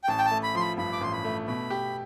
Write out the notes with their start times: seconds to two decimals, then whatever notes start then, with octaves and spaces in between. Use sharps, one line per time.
0.04 G5
0.08 A1 A5
0.18 G5
0.25 A5
0.31 A3
0.43 B5
0.55 F3 C6
0.60 B5
0.78 G2 B5
0.93 D6
1.01 A1 C6
1.13 B5
1.24 A3
1.47 B2 B5
1.70 G4